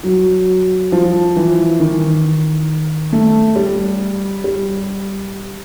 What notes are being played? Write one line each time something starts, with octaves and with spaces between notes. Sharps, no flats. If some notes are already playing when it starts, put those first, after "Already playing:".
F#3
F3
E3
D#3
A3
G3
G3